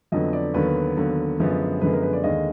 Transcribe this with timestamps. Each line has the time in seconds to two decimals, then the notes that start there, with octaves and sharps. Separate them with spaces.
0.12 F2 D3 F#3 B3 D#5
0.33 D5
0.54 D#2 D3 F#3 B3 B4
0.97 D#2 D3 F#3 B3
1.40 F#2 D3 F3 G#3 B3
1.81 F#2 D3 F3 G#3 B3 B4
1.93 A#4
2.03 B4
2.13 D5
2.24 D#2 D3 G#3 D#5